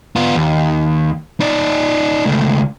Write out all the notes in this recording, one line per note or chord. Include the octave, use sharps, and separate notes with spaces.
B3 F4
D#2
D#4 D5
C#2 A3